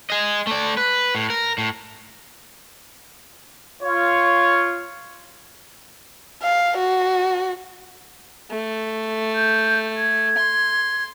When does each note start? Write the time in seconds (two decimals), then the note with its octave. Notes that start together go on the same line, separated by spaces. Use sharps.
0.10 G#4 D#5
0.47 A3 D5
0.77 B4
1.15 A2
1.30 A#4
1.58 A2
3.82 F4 C#5
6.43 F5
6.77 F#4
8.51 A3
9.35 G6
9.96 G#6
10.38 C6